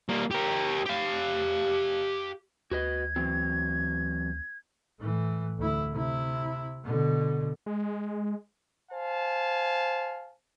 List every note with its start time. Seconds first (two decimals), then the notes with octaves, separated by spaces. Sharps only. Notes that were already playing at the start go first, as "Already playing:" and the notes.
0.09 G3 A#3
0.31 G4 A#4
0.86 G4 F5
2.71 D2 F#4 B4 D#5 G#6
3.16 E3 F#3 C4
5.00 A2 E3
5.58 D2 E4
5.92 C3 E4
6.84 B2 D3
7.66 G#3
8.91 C5 F5 G#5 A5